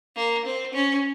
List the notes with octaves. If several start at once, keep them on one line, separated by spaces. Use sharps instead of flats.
A#3
C4
C#4